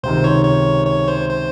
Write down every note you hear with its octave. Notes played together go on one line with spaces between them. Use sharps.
C#2 C3 D#3 C5
C#5
C#5
C#5
C5
C5